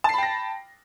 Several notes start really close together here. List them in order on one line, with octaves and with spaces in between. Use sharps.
A5 C7 B5 G5 A#6